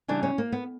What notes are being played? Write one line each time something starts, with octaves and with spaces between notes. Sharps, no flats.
C#3 E3 G3 D4
C#4
A#3
B3